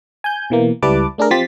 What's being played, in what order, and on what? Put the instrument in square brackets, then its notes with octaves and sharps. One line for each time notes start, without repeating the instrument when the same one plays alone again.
[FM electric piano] G#5 G6
B2 E3 A#3
C#2 G3 E4 B4 A5 D6
A3 D4 G#4 A#4
F3 C4 G4 C6 A6 B6